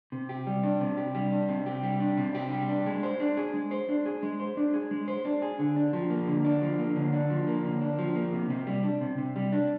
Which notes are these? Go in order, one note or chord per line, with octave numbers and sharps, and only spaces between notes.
C3
G4
G3
D4
C3
G4
G3
D4
C3
G4
G3
D4
C3
G4
G3
D4
G#3
C5
D4
G#4
G#3
C5
D4
G#4
G#3
C5
D4
G#4
G#3
C5
D4
G#4
D3
D4
F3
A#3
D3
D4
F3
A#3
D3
D4
F3
A#3
D3
D4
F3
A#3
C3
C3
G3
D4
C3
C3
G3
D4